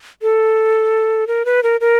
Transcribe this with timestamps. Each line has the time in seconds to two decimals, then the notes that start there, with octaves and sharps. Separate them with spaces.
0.22 A4
1.27 A#4
1.45 B4
1.63 A#4
1.81 A#4